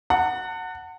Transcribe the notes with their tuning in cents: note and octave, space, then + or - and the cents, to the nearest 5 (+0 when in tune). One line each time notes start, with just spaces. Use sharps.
F#5 +0 A5 +45